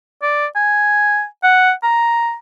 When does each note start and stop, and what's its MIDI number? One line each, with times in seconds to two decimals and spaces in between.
0.23 0.46 74
0.56 1.25 80
1.44 1.72 78
1.83 2.35 82